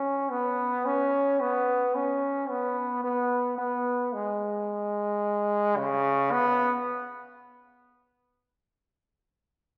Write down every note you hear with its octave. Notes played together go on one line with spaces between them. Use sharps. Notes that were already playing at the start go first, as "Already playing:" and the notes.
Already playing: C#4
B3
C#4
B3
C#4
B3
B3
B3
G#3
C#3
B3